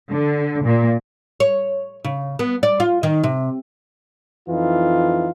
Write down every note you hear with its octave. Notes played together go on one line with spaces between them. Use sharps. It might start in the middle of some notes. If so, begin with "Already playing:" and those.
D3
A#2
C#5
C#3
B3
D5
F4
D#3
C3
F2 E3 D#4 F4